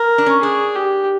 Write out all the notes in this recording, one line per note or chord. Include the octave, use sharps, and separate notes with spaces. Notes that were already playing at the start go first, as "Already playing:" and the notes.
Already playing: A#4
D4
C#4
D4 G#4
G4